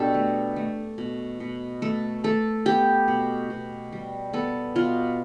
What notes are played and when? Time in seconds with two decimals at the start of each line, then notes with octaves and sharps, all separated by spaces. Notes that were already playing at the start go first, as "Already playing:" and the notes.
Already playing: B2 D4 G4 A4
0.14 A3
0.56 A3
0.98 B2
1.40 B2
1.82 A3 A4
2.24 A3 A4
2.66 B3 G4
3.08 B2
3.50 B2
3.92 G3
4.33 B3 A4
4.75 B2 F4